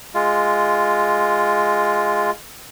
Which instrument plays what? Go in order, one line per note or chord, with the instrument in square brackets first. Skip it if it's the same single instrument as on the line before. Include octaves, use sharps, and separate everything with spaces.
[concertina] G#3 F4